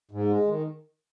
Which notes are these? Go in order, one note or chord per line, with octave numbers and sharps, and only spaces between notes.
G#2
G#3
D#3